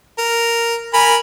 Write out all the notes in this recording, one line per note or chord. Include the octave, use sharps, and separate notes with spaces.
A#4
A#4 G#5 B5